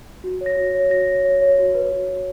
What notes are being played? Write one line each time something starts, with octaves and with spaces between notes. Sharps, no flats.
F#4
C#5
A#6
F#4
C#5
F#4 A#6
C#5
C#5
C#5
F#4
B4
F#4
F#4